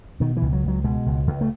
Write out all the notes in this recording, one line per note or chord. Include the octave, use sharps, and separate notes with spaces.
B2 D#3
E3
C#2
F#3
C#2 F#3
B2 G#3
C#2
C#2
A3